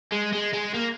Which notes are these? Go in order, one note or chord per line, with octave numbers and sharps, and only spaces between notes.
G#3
G#3
G#3
A#3